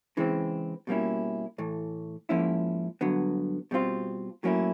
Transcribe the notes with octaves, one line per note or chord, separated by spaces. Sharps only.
C#3 E3 G#3 C4
B2 G3 A#3 C#4 E4
A2 E3 A3
G#2 F3 A#3 C#4 E4
G2 D3 F#3 B3
B2 G3 C4 F4
A2 F#3 A#3 C#4 E4